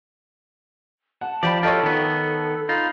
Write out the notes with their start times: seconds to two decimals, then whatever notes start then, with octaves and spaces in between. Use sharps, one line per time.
1.21 F#5 A5
1.43 F3 G4 D5 B5
1.63 F4 G4 A4 C#5 D#5 A5
1.83 D#3 B3
2.69 D#4 F4 B5